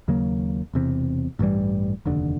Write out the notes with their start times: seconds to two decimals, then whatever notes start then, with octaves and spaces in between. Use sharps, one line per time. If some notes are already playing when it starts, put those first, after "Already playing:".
0.08 D#2 C#3 F#3 A#3
0.74 E1 E2 C3
1.39 A1 G2 E3 G3
2.06 F1 D#2 D3